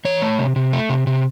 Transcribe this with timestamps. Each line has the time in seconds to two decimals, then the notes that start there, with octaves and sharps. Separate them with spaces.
0.05 E3 C#5
0.22 A3
0.39 C3
0.56 C3
0.73 A3
0.89 C3
1.07 C3